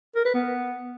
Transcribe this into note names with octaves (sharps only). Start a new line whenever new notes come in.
A#4
B4
B3